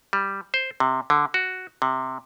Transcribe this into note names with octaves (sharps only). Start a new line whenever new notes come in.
G3
C5
C3
D3
F#4
C3